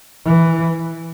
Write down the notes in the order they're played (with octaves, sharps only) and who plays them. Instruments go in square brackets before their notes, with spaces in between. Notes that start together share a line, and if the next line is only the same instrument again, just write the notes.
[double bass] E3